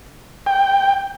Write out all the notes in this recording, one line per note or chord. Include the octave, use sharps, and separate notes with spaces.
G5